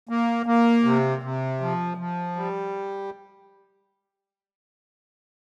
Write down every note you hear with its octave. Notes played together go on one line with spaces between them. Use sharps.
A#3
A#3
C3
C3
F3
F3
G3